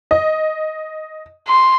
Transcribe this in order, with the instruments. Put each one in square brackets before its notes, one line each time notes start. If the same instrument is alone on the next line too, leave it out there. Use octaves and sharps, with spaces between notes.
[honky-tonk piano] D#5
[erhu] C6